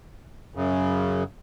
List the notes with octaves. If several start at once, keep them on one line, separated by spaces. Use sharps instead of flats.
F#2 C#3